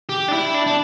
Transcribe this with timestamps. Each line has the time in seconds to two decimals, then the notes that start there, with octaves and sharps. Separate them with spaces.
0.09 G4
0.28 D4
0.33 E4
0.54 D4
0.66 D4